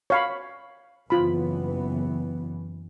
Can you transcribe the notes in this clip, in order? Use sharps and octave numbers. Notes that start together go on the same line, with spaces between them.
C#5 F5 B5
F#1 E3 B3 F4 B5